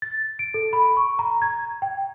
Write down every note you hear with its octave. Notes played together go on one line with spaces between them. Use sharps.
A6
D7
A4
B5
C#6
A#5
G#6
G5